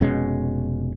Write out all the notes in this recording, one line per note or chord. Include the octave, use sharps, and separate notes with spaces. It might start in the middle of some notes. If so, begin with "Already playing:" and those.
F1 B2 G#3 C#4